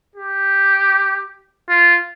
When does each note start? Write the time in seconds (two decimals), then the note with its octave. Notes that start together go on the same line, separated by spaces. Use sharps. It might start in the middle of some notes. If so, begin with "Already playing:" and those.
0.16 G4
1.69 F4